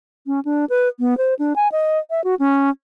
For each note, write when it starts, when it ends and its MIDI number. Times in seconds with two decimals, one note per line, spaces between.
0.26 0.40 61
0.45 0.65 62
0.69 0.88 71
0.99 1.17 59
1.17 1.34 72
1.39 1.53 62
1.56 1.68 80
1.72 1.98 75
2.10 2.23 76
2.24 2.35 66
2.39 2.70 61